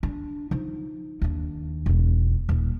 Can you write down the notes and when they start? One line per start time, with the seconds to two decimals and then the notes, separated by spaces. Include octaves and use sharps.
0.03 D4
0.51 F3 D#4
1.22 D#2 D4
1.86 E1 G#2
2.49 D#1